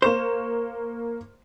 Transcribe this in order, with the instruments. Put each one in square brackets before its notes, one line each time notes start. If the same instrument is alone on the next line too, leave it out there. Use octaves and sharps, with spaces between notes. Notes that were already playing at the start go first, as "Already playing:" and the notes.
[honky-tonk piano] A#3 C#6 E7 [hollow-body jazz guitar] C5